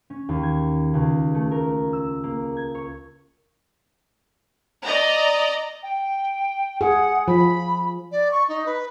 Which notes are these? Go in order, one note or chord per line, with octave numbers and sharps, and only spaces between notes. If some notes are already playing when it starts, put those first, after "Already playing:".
C#4
D#2
G#6
C#2
A3
A#4
E6
A#3
G#6
C#5
D5 D#5 A#5
G5
G#4 F#5
F3 B5
D5
C#6
D#4
B4